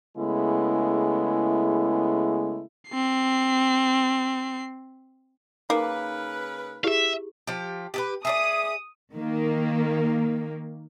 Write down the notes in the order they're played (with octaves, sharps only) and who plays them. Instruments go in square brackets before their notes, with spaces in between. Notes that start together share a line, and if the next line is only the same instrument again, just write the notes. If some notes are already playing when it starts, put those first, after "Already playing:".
[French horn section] C#3 G#3 A3 B3 E4
[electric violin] C4 C7
[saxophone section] C#3 A#4 B4 [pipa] A#3 [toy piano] D#4 D6
[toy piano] E4 G4 G#4 [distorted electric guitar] E5 F5
[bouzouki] F3 G4
G4 G#4 B4
[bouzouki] G#4 A4 D5 [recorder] E5 [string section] D#6
[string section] D#3 A#3